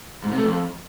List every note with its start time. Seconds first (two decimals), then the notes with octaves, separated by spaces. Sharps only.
0.23 G#2
0.30 C3
0.37 A3
0.44 F2